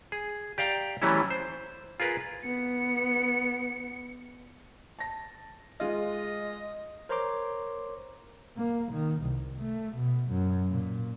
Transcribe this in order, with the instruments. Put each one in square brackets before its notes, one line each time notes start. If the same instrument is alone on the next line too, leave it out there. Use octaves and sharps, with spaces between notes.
[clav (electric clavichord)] G#4
G4 D5 F5 G5 A#5
E3 F#3 G3 A3 C#4 E4
C5
F4 G#4 A#4 B4
[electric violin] B3 C#7
[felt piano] A5 A#6
[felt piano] G#3 F4 [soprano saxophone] D#5
[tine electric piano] A#4 C5 C#5 A#5 C6 D6
[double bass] A#3
D#3
C2
A3
B2
F#2
A#2